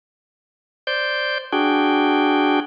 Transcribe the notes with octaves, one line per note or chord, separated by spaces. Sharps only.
C5 D5 G6
D4 F#4 G#4 G5